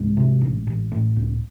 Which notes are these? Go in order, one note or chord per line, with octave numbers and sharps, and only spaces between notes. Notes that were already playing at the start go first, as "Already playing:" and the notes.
Already playing: C2 G#2 G#3
C3
A1
A1
A2
C#2